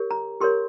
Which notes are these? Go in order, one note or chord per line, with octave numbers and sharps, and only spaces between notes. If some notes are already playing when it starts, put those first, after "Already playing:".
Already playing: G4 A#4 C#5
A#5
G4 A#4 C#5 C6